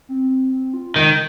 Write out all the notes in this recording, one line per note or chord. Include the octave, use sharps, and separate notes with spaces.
C4
C4
F4
D#3 G#3